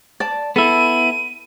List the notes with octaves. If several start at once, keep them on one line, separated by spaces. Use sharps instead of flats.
D5 A5
B3 E4 A4 D#7